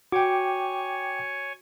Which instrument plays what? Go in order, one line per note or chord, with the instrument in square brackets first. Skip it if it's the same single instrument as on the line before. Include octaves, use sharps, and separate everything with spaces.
[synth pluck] F#4 [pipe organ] C#5 G#5 C#6 [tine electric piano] G5 D6